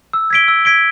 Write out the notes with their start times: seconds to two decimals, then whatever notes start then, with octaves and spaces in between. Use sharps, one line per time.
0.13 E6
0.30 G#6 B6 D7 G7
0.48 E6
0.65 G#6 B6 D7 G7